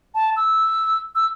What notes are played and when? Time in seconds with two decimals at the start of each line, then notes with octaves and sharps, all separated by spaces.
0.15 A5
0.37 E6
1.15 E6